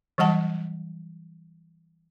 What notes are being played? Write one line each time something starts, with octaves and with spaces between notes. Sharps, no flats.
E3 F#3 G3 F#5 A5